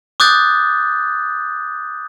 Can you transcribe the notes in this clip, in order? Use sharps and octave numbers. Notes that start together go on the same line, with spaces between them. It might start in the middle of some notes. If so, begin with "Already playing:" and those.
D6 D#6 F#6 G6 A6